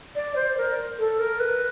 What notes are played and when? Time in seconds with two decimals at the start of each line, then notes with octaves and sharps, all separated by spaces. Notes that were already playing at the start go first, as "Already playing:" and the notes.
0.16 D5
0.36 C5
0.57 A#4
0.99 A4
1.20 A#4
1.40 B4